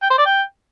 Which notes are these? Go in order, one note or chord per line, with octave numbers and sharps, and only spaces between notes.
G5
C5
D5
G5